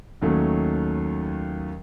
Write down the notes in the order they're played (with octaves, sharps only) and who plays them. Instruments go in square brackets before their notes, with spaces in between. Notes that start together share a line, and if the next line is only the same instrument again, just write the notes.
[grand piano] D#2 D#3 F#3 A3 C#4